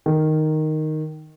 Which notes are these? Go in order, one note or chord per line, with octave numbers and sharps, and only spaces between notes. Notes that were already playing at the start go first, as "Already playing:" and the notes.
D#3